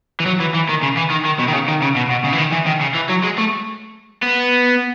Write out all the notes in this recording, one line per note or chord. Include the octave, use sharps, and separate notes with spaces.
E3
F#3
E3
E3
D#3
C#3
E3
D#3
D#3
B2
D#3
C#3
D#3
C#3
B2
B2
C#3
E3
D#3
E3
D#3
C#3
E3
F#3
G#3
A3
B3